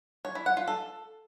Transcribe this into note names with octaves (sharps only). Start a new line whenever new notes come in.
C#5
E4
F#5
F4
A4